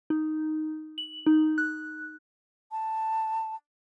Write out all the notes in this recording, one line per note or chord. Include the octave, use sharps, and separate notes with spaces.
D#4
F#7
D#4
F#6
A5